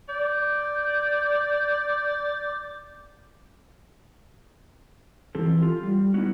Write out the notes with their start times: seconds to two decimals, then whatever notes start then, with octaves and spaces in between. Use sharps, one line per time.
0.09 D5 G6
5.35 E3 F3 C4 G4 A4
5.62 F4
5.83 G3
6.14 G3 A3 B3 D#4 E4 F#4